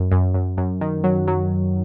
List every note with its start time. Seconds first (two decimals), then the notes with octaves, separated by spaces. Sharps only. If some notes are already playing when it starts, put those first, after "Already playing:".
Already playing: F#2
0.12 F#2
0.34 F#2
0.57 F#2
0.81 D#3
1.04 F#3
1.28 F#3